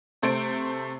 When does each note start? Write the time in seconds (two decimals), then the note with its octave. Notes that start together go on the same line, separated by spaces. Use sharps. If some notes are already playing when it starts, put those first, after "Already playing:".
0.22 C3 A3 C5 D7